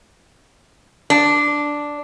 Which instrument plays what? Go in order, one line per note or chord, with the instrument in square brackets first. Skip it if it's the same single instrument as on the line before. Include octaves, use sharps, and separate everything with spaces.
[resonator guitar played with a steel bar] D4